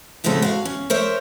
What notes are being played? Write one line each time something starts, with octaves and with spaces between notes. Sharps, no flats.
D#2 A2 C#3 G#3 C4 A4
F#4 F5
C#4
A#4 C5 C#5 E5